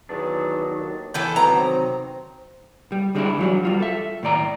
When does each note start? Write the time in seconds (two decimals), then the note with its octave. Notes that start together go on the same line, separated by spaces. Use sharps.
0.09 E2 D#3 F#3 D4
0.80 D#2
1.14 E3 A4 G5
1.36 C3 D#3 F#3 B3 A#5
1.57 C4
2.92 G3
3.15 D3 G3 G#3 C4 D4 E4
3.38 E3 F#3 G3
3.63 G3 F4 F#4
3.80 A4 E5
4.23 A2 D#3 D5 A#5